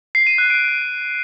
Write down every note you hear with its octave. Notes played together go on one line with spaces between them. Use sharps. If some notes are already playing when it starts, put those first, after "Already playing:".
C7
D#7
F#6
D7